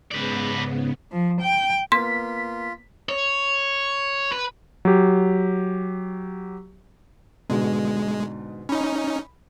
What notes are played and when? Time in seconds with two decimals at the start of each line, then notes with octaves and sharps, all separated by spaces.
0.11 G#2 C#3 B3 B4 D5
1.12 F3
1.41 G5
1.92 A#3 B3 F4 C6 B6
3.09 C#5
4.32 B4
4.85 F#3 G4
7.50 G#2 B2 D3 G#3
8.69 C#4 D#4 B5